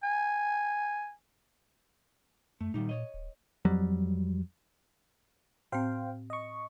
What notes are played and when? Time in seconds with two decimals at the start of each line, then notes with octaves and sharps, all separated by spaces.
0.03 G#5
2.61 F#2 A3
2.74 A#2 D#3 G3 D#4
2.89 C#5 D#5
3.14 D1
3.65 F2 F#3 G3
5.72 A2 C4 C5 F5 G5
6.30 D#5 C#6